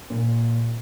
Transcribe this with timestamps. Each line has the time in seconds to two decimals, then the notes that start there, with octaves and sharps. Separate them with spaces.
0.10 A#2